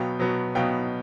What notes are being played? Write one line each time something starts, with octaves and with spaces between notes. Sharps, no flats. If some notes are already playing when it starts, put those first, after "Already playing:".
Already playing: B2 F#3 B3 F5 G5
B2 F#3 B3
B2 F#3 B3 F5 G5